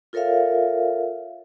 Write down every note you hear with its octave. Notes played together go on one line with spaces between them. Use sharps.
F4 A4 A#4 C#5 E5 F5